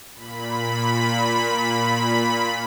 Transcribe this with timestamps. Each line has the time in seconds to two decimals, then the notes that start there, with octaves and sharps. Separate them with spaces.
0.15 A#2 B5